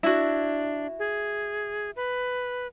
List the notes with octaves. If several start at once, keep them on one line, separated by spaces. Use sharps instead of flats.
D4 E4 F#4
G#4
B4